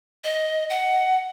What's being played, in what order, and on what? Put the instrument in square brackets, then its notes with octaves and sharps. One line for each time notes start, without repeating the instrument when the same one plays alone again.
[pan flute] D#5
F#5